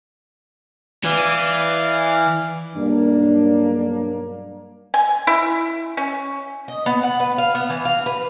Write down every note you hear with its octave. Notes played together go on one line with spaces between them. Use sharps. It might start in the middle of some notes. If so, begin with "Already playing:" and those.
E3 D5 F5
B1 G2 A#3 D4
G#5
E4
C#4
D#5
B3
F#5
B4
F5
B3
E3
F5
B4